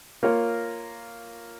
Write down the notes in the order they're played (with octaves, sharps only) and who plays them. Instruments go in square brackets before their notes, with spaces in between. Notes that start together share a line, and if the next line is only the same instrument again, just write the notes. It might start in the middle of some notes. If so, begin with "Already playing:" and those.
[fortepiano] A#3 F4 A#4 C#5